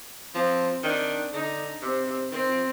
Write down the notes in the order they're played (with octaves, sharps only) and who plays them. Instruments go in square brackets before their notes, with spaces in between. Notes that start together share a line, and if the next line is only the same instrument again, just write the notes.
[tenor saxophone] F3 [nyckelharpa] C4
[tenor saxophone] D#3 [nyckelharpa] D4
[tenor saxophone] D3 [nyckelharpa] D#4
[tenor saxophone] C3 [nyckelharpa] C4
[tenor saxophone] C3
[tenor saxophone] D#3 [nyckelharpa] C4
[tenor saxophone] F3